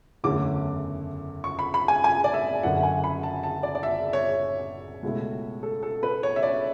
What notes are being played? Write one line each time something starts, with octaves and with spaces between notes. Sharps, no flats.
F#1 E2 D3 A3 C#4 D6
C#6
B5
B5
G#5
G#5
D5
E5
F#1 F#2 D3 F#5
G#5
B5
A5
A5
D5
D5
E5
C#5
C#2 B2 A3 E4
A4
A4
B4
C#5
E5
D5